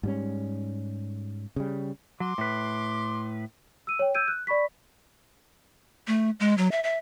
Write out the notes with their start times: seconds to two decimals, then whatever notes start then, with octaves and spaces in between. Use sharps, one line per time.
0.03 G#2 G3 C#4
1.56 C#3 G3
2.20 F#3 C6 D6
2.38 A2 B4
3.87 E6 D#7
3.99 C#5 G5
4.15 E6 F6 G6 G#6 D7 D#7
4.28 F#6
4.47 D5 B5 C#6 B6
6.07 A3
6.40 G#3
6.58 F#3
6.72 E5
6.83 E5